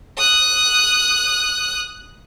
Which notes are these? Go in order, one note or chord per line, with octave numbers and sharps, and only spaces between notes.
D#6 F#6